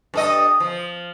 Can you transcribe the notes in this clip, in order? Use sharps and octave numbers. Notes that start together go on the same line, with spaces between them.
G2 A4 D#5
F3